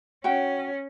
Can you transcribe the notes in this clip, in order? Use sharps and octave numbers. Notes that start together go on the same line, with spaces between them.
C#4 F#4 G5